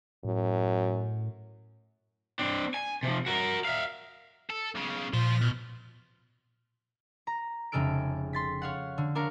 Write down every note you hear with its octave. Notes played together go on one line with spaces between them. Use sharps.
F#2 A2
C4 D4
G#5
C3 F3
F#4 A#4
E5 F5
A4
B1 C#3
A#2 F3 C6
B2
A#5
F1 C#3 G#3 A4 F6 D7
C6 A6 B6
C#5 F5 F#5
D3
D4 A#4 C#5 F5